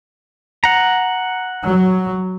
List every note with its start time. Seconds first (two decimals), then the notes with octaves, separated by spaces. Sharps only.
0.64 F#5 A#5
1.66 F#3